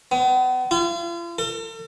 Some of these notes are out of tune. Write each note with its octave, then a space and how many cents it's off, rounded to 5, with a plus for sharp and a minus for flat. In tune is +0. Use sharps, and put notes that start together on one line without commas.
B3 +40
F4 -40
A4 +45